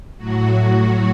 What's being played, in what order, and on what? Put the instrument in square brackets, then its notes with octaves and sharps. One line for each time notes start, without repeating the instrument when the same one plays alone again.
[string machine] A2 F#3 F#4